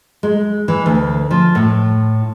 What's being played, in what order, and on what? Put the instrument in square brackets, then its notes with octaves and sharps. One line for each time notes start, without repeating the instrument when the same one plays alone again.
[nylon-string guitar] G#3
E3
D2
F3
A2